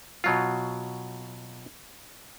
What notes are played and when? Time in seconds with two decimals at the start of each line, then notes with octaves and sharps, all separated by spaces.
0.24 B2 F#3 F4